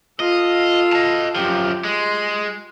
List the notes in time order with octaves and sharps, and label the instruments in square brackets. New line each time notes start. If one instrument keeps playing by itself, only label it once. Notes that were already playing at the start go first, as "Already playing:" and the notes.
[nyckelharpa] F4 A4 [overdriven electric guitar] D#5
[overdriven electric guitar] D#5 A5
[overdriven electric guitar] F#2 F3 [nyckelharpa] G4
[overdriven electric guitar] G#3 [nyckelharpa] C6